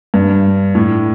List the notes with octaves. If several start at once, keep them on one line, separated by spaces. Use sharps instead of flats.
G2
A2